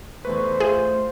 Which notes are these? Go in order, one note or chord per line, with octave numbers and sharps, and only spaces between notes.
E2 A3 B4 C5 C#6
A3 F4 G#4